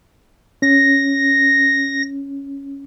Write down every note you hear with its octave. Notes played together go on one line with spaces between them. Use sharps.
C#4 A#6